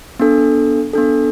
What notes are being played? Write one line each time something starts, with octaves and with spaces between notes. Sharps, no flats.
B3 D4 A4
B3 D4 A4